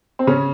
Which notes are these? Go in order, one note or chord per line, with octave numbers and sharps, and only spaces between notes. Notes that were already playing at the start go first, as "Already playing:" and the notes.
C4
C#3 C#4